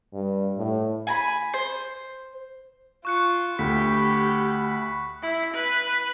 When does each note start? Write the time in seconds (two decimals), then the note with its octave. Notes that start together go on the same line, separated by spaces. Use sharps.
0.14 G2
0.58 A2
1.07 G#5 A#5 B5
1.54 C5
3.05 F4 C#6 F#6 C#7
3.59 D2 G4 B5 B6
5.22 E4
5.54 B4